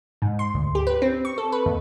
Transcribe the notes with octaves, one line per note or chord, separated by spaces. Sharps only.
G#2
C6
D2
G4
B4
C4
C#6
A4
B4
D#2